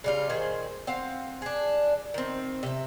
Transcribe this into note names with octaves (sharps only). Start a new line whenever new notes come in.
C#3 G3 F4
A#2 D#3 G#4 C5
C4 F5 F#5
D4 G#4
D#3 C4
C3 E5